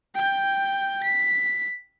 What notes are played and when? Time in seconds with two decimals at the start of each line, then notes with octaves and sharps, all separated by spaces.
0.15 G5 G6
1.03 B6